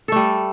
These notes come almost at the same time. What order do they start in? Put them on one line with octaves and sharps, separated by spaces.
A4 A3 G3